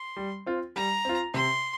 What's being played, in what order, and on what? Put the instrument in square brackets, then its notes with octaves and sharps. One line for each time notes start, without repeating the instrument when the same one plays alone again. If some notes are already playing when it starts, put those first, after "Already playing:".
Already playing: [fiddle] C6
[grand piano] G3
C4 F4
[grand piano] G3 [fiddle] A#5
[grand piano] C4 F4
[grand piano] C3 [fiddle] C6